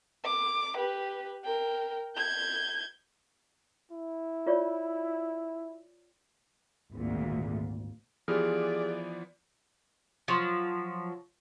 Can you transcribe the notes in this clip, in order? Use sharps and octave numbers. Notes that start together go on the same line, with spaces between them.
D6
G4 B4
A#4 G5
G6 G#6
E4
F4 C#5 D5
G#1 D2 A#2
E3 F3 B3 G4 G#4 D5 F6
F3 F#3